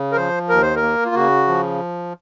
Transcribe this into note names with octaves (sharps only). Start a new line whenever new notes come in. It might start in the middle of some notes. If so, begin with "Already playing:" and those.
Already playing: C#3
A#4
F3 C5
D#2 A#4
C5
A#4
A#3
F4
C#3 F#4
F3